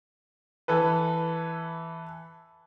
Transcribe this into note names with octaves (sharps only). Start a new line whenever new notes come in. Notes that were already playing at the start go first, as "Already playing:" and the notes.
E3 A4 B4